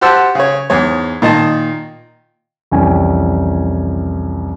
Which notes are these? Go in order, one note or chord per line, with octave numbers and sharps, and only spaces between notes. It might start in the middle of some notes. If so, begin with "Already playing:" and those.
F#4 G4 C5 F#5 A5 E6
C#3 C#5
E2 G#2 C#5
A#2 D#3 D#5 A5
C2 F2 E3 C#4 G5 G#5